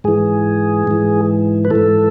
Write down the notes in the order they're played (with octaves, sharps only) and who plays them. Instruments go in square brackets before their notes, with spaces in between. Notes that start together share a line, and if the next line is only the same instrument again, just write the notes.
[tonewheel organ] G#2 E3 G#4
G#2 E3
B4
G#2 E3 A4